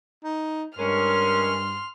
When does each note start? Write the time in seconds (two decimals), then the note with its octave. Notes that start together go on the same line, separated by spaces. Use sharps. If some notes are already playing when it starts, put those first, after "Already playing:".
0.24 D#4
0.79 G2 G#3 C#4 A#4 C6 F6